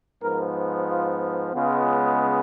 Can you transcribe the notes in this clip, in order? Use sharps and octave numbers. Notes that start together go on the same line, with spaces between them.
G#2 F3 B3 A#4
F4
C#2 C#3 G#3 B3 F4